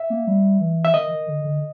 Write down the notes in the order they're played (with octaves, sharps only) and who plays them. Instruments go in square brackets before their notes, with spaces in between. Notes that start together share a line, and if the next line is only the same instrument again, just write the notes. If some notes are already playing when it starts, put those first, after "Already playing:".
Already playing: [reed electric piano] E5
[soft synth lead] A#3
G3
E3
[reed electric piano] E5
[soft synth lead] D#3 [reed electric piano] D#5
[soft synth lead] D#3
D3
D3